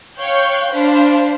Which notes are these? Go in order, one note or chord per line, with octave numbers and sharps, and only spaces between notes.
C#5 F5 G5 C#6 F#6 G6
D4 C5 F5 B5